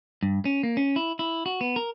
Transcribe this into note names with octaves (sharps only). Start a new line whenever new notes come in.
G2
C#4
A#3
C#4
E4
E4
F#4
B3
A#4